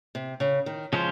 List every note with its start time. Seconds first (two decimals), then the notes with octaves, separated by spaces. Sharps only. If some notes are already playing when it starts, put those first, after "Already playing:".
0.15 C3
0.40 C#3
0.66 D#3
0.92 C#3 F3 G#3 C#4 F4 C5